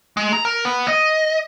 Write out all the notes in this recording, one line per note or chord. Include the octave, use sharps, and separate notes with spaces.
G#3
A#5
A#4
B3
D#5